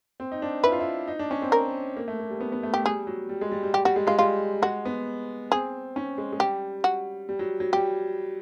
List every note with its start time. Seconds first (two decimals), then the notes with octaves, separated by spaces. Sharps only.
0.20 C4
0.32 D#4
0.42 D4
0.63 E4 B4
0.72 F4
0.80 E4
1.08 D#4
1.19 D4
1.31 C#4
1.42 C4
1.52 A#4
1.97 A#3
2.08 A3
2.20 A#3
2.30 G3
2.40 B3
2.52 B3
2.63 A3
2.74 A3 G4
2.86 G3 G#4
3.07 F#3
3.29 G3
3.41 G#3
3.51 G3
3.63 G3
3.73 G3 G4
3.85 G3 F#4
3.96 G#3
4.07 G#3 F4
4.18 G3 F4
4.62 G#3 F#4
4.85 B3
5.52 C4 G#4
5.96 C#4
6.18 G#3
6.32 G#3
6.39 G3 G4
6.84 F#4
7.29 G3
7.39 F#3
7.60 F#3
7.73 G3 G4